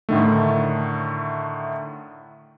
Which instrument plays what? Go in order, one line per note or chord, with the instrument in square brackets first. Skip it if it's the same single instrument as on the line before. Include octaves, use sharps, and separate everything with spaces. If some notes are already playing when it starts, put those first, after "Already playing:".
[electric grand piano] A2 D3 D#3 A3